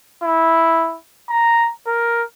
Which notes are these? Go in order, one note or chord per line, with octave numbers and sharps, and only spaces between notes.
E4
A#5
A#4